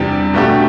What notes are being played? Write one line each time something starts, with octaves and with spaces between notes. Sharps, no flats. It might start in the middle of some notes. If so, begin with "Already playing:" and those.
Already playing: E2 C3 G3 D4 G4
B2 A3 D4 G4